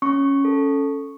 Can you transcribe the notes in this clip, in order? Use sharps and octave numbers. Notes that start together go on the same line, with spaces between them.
C#4 C#6
A4